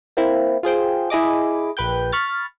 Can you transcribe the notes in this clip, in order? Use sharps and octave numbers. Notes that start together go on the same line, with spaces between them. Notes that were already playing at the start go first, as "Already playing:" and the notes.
A#3 C4 E4
F4 G#4 C5 G5
E4 G#4 D#5 D6
A#1 B4 G5 G6
B5 C#6 F6 A6